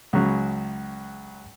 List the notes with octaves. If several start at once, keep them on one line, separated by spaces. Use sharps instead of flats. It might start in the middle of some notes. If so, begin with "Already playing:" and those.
C#2 C#3 F#3